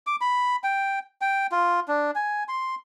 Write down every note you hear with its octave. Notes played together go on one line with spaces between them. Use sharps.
D6
B5
G5
G5
F4
D4
G#5
C6